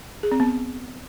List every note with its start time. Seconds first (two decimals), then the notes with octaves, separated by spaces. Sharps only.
0.23 G#4
0.32 C4
0.40 B3